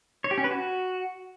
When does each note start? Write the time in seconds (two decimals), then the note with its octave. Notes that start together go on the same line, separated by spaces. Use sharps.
0.24 C#5
0.31 G4
0.38 C#4
0.44 B4
0.51 F#4